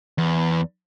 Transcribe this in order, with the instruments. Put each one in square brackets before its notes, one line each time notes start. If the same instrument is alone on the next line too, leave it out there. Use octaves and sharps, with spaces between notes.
[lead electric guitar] E2